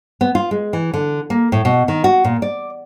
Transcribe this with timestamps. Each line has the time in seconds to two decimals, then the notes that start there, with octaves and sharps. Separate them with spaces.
0.21 B3
0.35 F4
0.51 G#3
0.73 E3
0.94 D3
1.30 A#3
1.52 A2
1.65 B2
1.88 D#3
2.04 F#4
2.24 A#2
2.42 D5